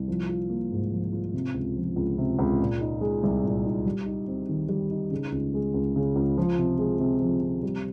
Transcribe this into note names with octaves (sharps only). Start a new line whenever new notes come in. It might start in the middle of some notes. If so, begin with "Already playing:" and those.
Already playing: C2
F3
F4
A#3
G#2
F3
F4
C3
C#2
F3
C#2
C3
C#2
A#2
D#4
G#3
C2
A#2
D#4
G3
D#4
C4
D#3
G3
D#4
C#3
C#2
G#3
C#2
C#3
C#2
F3
C3
G#3
C3
F3
C3
G3